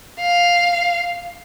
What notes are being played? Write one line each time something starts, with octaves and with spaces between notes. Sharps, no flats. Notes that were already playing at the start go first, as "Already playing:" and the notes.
F5